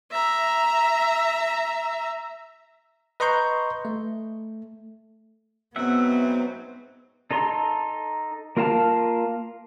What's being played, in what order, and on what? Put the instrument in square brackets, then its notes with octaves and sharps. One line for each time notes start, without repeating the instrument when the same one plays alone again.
[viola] E5 A#5
[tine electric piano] B4 D#5 A#5 C6 C#6 G6
A3
[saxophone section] G#2 F#3 C4 [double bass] B3 [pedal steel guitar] E5 F#5
[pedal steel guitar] D#4 A4 A#5 C6
A#3 F4 A#4 F5 A5